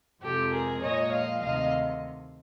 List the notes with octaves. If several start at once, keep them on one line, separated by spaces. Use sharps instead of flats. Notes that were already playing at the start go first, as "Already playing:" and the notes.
F2 C3 F3 G#3 G4 A4
G#4 A#4
A#2 F3 G#3 C#5 D#5
D#5 F5
D2 C3 D#3 D#5 F5